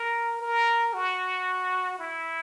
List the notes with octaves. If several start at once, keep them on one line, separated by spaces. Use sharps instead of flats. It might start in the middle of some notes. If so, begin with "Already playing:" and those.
Already playing: A#4
A#4
F#4
E4